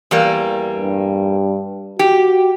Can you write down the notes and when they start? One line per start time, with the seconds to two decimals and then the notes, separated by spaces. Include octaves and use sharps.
0.11 E2 G3 A#3
0.77 G2
1.99 F#4 G4